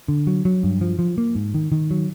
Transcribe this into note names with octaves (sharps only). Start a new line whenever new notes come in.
D3
F#3
F#3
G2
F3
F3
A#3
G#2
D#3
D#3
F#3